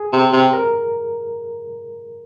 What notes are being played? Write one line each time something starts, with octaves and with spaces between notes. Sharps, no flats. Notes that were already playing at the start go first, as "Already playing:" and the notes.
Already playing: G#4
C3
C3
A#4